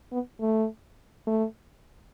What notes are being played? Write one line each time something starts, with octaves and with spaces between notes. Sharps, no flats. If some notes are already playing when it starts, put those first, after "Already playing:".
B3
A3
A3